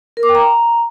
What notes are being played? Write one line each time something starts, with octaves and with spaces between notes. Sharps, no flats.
A#4
D6
G5
A#5